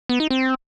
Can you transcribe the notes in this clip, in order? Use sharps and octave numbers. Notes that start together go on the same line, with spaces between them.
B3
D#4
C4